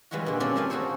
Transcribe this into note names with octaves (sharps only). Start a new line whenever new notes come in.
E3 G3 G#3 F4 F#4
A#2 D3
C4 C#4 A4 A#4 C5 D5
G3 A3 A#4 F5 G#5
F#4 G#4 A4 C5 C#5